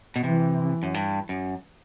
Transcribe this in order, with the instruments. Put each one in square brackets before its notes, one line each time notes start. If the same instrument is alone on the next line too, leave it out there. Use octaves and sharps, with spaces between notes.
[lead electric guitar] B2
[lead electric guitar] C3 [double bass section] E3
[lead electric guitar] F#2
G2
F#2